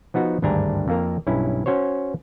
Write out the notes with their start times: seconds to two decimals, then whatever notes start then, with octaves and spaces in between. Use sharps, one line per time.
0.14 F3 B3 D#4 F#4
0.42 G#1 D2 G2 D4 G#5 A#5
0.88 F2 A#3 A#4
1.27 B1 G2 C#4 E4
1.66 C#4 F#4 C5 C#5